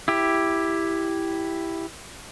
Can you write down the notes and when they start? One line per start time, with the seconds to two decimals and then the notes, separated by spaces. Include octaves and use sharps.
0.08 E4 G4